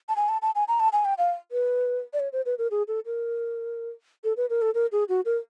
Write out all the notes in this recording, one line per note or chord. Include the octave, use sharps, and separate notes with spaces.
A5
G#5
A5
A5
G#5
A#5
A5
G#5
G5
F5
B4
D5
C#5
C5
B4
A#4
G#4
A4
A#4
A4
B4
A#4
A4
A#4
G#4
F#4
A#4